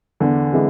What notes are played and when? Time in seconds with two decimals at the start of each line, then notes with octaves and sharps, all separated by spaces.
0.20 E2 D3
0.52 C3 E3 G#3